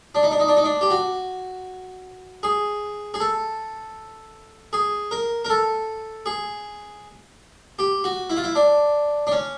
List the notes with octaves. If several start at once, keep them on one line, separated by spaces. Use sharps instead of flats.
D4
D#4
D4
D#4
D4
D#4
D4
G4
F#4
G#4
G#4
A4
G#4
A#4
A#4
A4
G#4
G4
F#4
E4
F4
E4
D4
D4
C#4